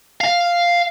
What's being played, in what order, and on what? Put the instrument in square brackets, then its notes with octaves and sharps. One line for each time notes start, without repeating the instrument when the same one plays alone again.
[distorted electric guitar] F5